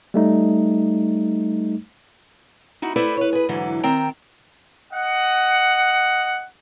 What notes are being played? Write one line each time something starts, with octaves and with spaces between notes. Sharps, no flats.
G3 A3 D#4
D#4 E4 F#4
E4 A4 B4 C5 D5
B4 C#5
G#4 B4
G#2 D3 E3 F#3
D#3 C4 G5 A#5
D#5 F#5